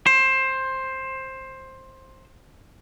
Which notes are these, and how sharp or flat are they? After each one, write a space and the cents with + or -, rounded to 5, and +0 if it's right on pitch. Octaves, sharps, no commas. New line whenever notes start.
C5 +15